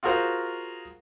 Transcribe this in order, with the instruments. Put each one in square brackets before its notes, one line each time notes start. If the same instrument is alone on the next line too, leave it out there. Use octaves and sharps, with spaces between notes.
[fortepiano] F4 F#4 G#4 A#4 C5